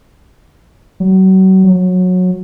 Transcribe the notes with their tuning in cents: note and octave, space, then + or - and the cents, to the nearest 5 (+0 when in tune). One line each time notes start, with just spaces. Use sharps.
F#3 +35
F#3 -20